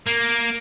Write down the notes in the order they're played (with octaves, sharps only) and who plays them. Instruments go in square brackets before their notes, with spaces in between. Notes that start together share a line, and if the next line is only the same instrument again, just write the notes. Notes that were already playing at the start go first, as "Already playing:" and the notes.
[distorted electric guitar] A#3